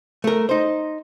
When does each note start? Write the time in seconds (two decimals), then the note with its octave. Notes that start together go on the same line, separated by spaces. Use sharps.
0.24 A3 A#4
0.49 D#4 C5